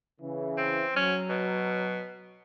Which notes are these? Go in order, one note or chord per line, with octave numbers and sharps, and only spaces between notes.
C#3 E3
C4
F#3 C#4
B2